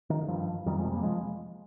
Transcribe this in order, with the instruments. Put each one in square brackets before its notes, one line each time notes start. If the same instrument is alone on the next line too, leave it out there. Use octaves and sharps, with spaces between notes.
[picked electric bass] D#3
G2 F3
F2 D#3 G3
F3 G#3
C3
G3 A#3
F3 G#3